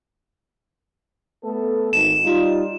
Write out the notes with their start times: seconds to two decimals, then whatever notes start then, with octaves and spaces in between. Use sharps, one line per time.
1.44 A3 B3 A4
1.93 G#1 E7
2.24 G3 D#4 F4